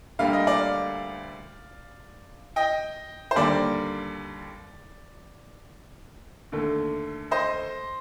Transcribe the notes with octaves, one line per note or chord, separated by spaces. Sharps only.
D2 D3 G3 A#3 F5
D#5
D5 F5
D#5 G5
C5
D#2 D3 G3 A#3 D5
D#2 D3 A3
C5 D#5